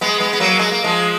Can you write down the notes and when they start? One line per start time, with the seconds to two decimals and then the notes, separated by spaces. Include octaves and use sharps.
0.01 G#3 B3
0.20 G#3 B3
0.33 B3
0.40 F#3 A#3
0.59 G#3
0.72 A#3
0.84 F3 G#3